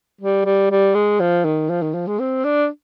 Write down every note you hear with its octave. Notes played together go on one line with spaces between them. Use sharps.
G3
G3
G3
G#3
F3
D#3
F3
D#3
F3
G#3
C4
D4